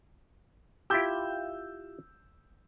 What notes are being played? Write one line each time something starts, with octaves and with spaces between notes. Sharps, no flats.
E4 F4 G4 E6 G6